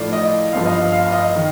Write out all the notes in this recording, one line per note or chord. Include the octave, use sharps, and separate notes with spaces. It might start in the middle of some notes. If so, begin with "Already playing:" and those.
Already playing: A2 F3 A3 D#4 D5 F5
D#5
G1 G2 F3 F5
D#5
F5
F5
F5
D#5
D#3